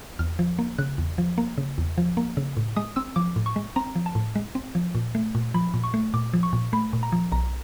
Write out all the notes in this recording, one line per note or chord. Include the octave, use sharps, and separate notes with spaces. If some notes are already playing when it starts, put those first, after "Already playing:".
E2 F6
F3
A#3
C#3 F#6
E2
F3
A#3
C#3
E2
F3
A#3
C#3
A2
G#3 D#6
C4 E6
F3 D6
A2
C#6
G#3
C4 A#5
F3
A5
A2
G#3
C4
F3
A#2
A3
A#2
F3 B5
A#2
C#6
A3
A#2 D6
F3
C#6
A#2
A3 B5
A#2
A#5
F3
B1 A#5